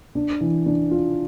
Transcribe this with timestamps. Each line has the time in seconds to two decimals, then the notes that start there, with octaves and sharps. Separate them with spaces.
0.15 D4
0.41 E3
0.66 D4
0.91 F4